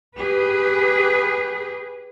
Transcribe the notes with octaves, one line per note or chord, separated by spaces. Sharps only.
G4 G#4 B4